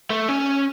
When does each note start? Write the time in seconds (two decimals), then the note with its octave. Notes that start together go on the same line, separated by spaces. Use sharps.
0.10 A3
0.28 C#4